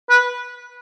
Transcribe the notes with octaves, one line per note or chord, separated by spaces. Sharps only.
B4